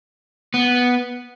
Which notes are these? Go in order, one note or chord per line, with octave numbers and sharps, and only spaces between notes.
B3